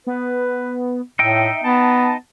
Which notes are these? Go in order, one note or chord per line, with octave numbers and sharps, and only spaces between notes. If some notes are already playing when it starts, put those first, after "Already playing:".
B3 B4
A2 D#4 E5 G5
B3 A5